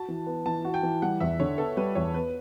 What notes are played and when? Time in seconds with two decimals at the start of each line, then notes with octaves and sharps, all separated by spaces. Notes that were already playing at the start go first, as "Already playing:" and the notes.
Already playing: F#4 A5
0.08 E3
0.27 B3
0.45 E3 A5
0.65 F#4
0.74 G5
0.83 E3
1.02 G3 F#5
1.20 E2 E5
1.40 D3 C#5
1.58 B3 A4
1.77 G3 B4
1.95 E2 C#5
2.14 B3 B4